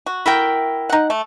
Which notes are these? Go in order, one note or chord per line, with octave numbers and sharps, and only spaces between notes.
F#4
E4 A#4 G5
D#4 F#5
A3